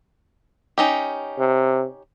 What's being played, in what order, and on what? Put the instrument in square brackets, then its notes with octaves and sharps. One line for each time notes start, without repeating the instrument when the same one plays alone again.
[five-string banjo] C#4 D#4 G4
[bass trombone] C3